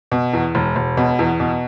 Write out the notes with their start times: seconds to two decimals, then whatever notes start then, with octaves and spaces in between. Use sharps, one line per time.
0.12 B2
0.33 E2
0.55 E1
0.76 E1
0.97 B2
1.19 E2
1.40 B2